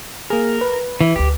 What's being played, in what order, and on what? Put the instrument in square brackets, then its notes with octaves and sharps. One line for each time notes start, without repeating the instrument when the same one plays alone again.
[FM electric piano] A#3 G#4 [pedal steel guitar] A#4
[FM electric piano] B4
[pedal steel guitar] E3
[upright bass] D2 A#3 [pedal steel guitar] G4